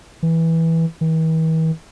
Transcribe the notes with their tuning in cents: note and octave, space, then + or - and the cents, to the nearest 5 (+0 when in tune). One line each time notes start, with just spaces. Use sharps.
E3 -10
E3 -45